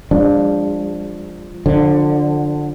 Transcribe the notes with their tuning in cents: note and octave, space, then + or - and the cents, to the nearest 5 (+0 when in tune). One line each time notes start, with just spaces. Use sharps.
F3 +0 G#3 -40 D4 +0
D3 +10 F3 +30